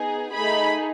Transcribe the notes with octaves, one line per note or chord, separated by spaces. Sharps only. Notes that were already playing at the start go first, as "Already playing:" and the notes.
Already playing: B3 D#4 G#4
A3 D#4 G#4 B5